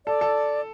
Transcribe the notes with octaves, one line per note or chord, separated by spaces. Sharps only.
A4 D5
A4